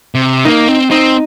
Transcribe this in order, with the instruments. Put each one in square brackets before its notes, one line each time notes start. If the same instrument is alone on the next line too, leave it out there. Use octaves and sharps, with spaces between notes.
[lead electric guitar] C3
[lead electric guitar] A#3 [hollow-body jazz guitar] D#4
[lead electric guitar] C4
[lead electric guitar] C4 [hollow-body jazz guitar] D#4